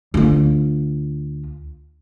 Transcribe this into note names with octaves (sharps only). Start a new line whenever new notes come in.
D2 F4